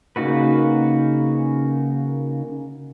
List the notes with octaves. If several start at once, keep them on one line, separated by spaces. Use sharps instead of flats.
C#3 A#3 D#4 F#4 B4